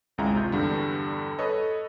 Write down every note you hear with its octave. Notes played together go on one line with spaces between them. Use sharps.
G#1 C#2 G#3 E4 A#5
C3 F4 G6
E2 G2 D3 G3
A4 B4 C#5 D#5